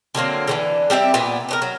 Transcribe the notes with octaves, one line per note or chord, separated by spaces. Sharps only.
D3 F#3 A#3 C4
D3 E3 G3
G3 C4 G4 E5
A#2 B3
B3 D4 A#4
F#3